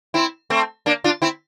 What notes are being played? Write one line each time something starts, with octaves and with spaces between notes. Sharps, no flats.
C4 E4
A3 C4
A#3 D4
D4 F4
C4 E4